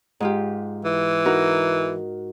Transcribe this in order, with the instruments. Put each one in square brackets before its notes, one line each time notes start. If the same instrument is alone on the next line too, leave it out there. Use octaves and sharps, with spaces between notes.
[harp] G#2 F4 G4
[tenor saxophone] E3
[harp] D#4 F#4 A#4